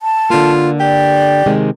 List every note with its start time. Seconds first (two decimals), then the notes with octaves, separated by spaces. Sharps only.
0.01 A5
0.30 D3 A#3 F4
0.80 G4 D5
1.46 C3 D#3 G#3